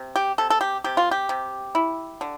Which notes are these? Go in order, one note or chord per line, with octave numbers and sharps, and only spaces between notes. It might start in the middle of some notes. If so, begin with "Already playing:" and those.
Already playing: C3
G4
C3 A4
A4
G4
C3 G4
F4
G4
C3
E4
D3